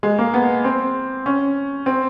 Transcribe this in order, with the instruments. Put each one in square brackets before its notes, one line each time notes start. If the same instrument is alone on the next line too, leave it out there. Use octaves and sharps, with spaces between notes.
[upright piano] G#3
A#3
B3
C4
C#4
C4